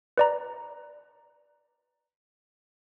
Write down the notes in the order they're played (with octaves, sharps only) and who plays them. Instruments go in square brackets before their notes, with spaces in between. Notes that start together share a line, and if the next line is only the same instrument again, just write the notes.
[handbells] B4 D5 A#5